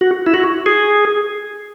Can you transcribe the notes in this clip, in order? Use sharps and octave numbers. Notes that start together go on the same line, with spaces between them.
F#4
E4
F#4
G#4